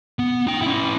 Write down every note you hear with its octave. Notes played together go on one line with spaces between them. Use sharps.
B3
D#4 G5
C#4 E4